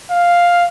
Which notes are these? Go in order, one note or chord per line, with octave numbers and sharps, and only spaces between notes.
F5